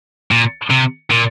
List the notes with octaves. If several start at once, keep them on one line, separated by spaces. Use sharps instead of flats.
A#2
C3
A#2